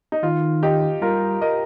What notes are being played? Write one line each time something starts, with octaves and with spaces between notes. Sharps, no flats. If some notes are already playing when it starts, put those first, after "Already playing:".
D#4
D#3 F4
D#4 G4
G3 F4 A#4
A#4 D#5